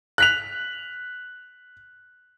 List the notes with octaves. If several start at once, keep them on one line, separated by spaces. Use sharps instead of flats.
F#6 B6 F7